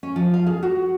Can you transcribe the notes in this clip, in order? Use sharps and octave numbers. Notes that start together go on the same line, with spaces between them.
C#4
F3
F5
G#4
F#4